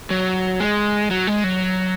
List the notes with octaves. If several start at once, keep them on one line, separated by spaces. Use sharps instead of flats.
F#3
G#3
F#3
G#3
F#3